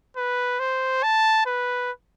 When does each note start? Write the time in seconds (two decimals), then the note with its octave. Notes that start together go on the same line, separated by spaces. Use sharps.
0.17 B4
0.60 C5
1.03 A5
1.46 B4